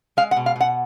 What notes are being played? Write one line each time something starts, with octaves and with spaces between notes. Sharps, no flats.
G#3 F5
F#5
B2
F5
B2 F#5